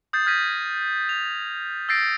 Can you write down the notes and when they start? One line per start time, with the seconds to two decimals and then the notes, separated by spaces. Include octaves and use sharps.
0.13 D#6 G6 A6 C7
0.26 F6 G6 G#6 A#6 B6 D#7
1.09 F7
1.89 E6 G6 A6 A#6 C7 D7